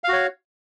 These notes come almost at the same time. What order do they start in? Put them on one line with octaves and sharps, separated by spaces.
F5 F#4 C#5